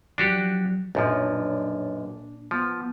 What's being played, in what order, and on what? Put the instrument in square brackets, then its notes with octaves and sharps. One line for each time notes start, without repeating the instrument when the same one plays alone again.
[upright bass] F3 F#3 [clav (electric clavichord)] D4 F#4 G4
[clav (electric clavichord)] B1 F#2 F3 [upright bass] A#2 [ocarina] D4
[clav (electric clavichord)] F3 [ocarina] B3